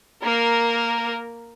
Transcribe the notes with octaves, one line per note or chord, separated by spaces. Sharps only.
A#3 A#4